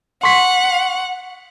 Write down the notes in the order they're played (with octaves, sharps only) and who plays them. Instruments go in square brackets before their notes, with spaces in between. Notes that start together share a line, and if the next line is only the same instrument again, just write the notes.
[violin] F#5 [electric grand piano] C6 C#6 B6